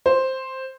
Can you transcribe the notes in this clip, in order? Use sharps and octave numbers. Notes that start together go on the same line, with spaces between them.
C5